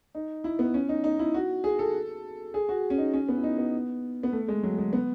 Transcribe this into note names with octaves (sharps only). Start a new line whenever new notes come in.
D#4
E4
B3
C#4
D#4
D#4
E4
F#4
G#4
A4
G#4
F#4
C#4
D#4
C#4
B3
E4
D#4
B3
B3
A3
G#3
F#3
G#3
B3